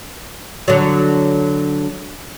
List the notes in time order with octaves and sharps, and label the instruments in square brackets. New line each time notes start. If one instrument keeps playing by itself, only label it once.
[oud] D3 F#3